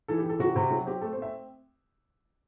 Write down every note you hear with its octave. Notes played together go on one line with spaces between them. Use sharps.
E3 A4
G4
E3
A4
C3 F#4
C3
F#3 F#4
C4 G4
A3 A4
C5
C4 E5